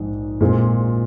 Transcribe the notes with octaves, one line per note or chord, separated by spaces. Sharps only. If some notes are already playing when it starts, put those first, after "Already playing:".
Already playing: A#1 G#2 F3
A#2 G#3 C4 F4